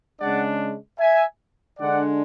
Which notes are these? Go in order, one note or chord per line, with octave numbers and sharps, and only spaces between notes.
C#3 G#3 D4 D5 F#5
E5 G#5
D3 G#3 D4 D5 F#5